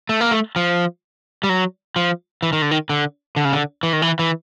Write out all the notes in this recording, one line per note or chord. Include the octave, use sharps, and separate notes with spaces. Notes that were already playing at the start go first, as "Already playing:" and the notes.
A3
A#3
A3
F3
G3
F#3
F3
E3
D#3
D3
D#3
D3
D3
C#3
D3
E3
D#3
E3
E3